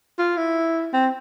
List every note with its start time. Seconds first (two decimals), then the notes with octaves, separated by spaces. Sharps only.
0.18 F4
0.37 E4
0.93 C4